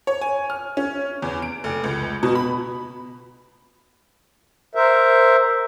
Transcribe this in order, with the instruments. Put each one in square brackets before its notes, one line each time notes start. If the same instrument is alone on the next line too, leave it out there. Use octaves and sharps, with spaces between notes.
[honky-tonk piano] C#5
G#5
F6
C#4
E2
D7
F1
C#2
B2
B5
[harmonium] A#4 C5 E5